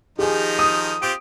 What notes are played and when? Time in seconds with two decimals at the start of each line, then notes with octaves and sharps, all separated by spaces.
0.19 D#3 F3 D#4 G4 G#4
0.59 D#6
1.02 C4 F4 G4 D7